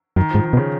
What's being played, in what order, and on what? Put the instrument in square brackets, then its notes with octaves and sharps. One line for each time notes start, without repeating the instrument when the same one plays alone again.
[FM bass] F#2 [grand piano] D#3
[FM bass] G#2 [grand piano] F3
[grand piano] D#3
[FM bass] B2
[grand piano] C#3